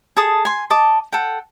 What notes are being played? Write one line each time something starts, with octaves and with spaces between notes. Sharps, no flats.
G#4 A4 A5 D#6
G#5 C6
D#5 A5 D6
A4 F#5 G5